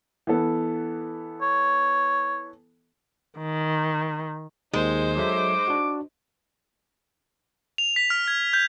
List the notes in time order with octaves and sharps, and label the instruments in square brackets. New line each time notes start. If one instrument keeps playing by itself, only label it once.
[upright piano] E3 B3 A4
[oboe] C#5
[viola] D#3
[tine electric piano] D#2 D#3 [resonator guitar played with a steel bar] G#3 [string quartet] D#4 C5
[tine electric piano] F#3 A4 E5 [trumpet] D6
[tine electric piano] D4 F#4
[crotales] F7
B6
F6
G#6
G6